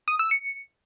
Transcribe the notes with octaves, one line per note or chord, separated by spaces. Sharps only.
D#6
E6
C#7